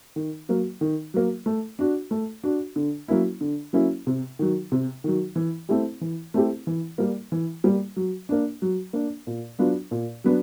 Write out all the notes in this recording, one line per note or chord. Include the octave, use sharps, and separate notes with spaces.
D#3
F#3 A#3
D#3
F#3 A#3
A3
D4 F#4
A3
D4 F#4
D3
F#3 A#3 C#4 E4
D3
F#3 A#3 C#4 E4
C3
D#3 F#3
C3
D#3 F#3
E3
A3 C4 E4 G4
E3
A3 C4 E4 G4
E3
G3 A#3
E3
G3 A#3
F#3
A#3 D4
F#3
A#3 D4
A#2
F#3 B3 D4 F4
A#2
F#3 B3 D4